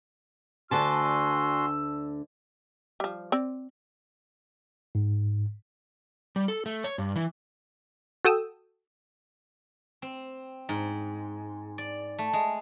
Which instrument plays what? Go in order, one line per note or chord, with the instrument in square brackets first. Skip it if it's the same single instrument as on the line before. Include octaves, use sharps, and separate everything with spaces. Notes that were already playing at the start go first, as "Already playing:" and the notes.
[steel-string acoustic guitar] D2 D3 A5 [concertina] F#4 C6 [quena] G#5 [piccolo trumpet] E6
[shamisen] F3 G3
C4 D5
[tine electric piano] G#2
[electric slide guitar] G3
A4
A3
C#5
G2
E3
[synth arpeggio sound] F#4 A4 G5 D#6 E6
[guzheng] C4
G#2
D5
A3
G#3